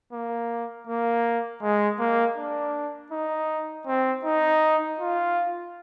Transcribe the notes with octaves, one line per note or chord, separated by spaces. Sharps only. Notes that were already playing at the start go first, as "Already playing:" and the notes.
A#3
A#3
G#3
A#3
D4
D#4
C4
D#4
F4